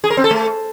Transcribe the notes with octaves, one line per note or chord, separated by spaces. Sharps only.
G#4
A#4
C4
A4
A3